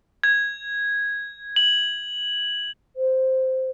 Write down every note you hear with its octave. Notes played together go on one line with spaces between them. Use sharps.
G#6
F#7
C5